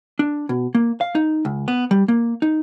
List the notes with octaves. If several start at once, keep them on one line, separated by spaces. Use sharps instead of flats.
D4
B2
A#3
F5
D#4
C#2
B3
G3
A#3
D#4